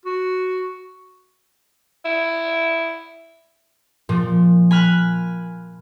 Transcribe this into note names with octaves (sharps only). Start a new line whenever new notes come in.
F#4
E4
A#2 F3
G#5 B5 F6 F#6